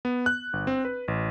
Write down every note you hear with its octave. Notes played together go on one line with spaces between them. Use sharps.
B3
F#6
G1
C4
B4
A1